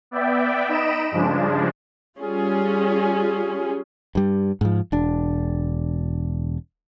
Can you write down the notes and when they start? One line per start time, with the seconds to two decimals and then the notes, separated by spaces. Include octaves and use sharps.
0.11 B3 D5 E5 G5
0.69 D#4 D#5 B5 D7 E7
1.11 G2 C#3 F3 G#3 D4
2.19 G3 C#4 F4 G#4
4.15 G2 G3
4.61 G#2 F3
4.92 E1 D4